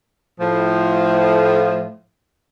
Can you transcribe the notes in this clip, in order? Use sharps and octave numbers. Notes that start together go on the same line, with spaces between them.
A2 F3